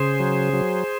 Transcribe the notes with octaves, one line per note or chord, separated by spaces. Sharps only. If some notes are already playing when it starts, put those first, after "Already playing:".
Already playing: C#3 G#4 C5
F#3
F#3